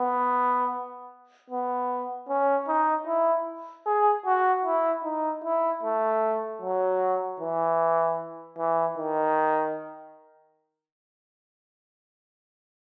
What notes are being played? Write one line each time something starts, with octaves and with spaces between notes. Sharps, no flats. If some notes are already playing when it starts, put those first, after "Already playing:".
Already playing: B3
B3
C#4
D#4
E4
G#4
F#4
E4
D#4
E4
A3
F#3
E3
E3
D#3